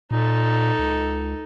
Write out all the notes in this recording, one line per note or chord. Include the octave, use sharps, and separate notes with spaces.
A#2 D#4 A4
C#2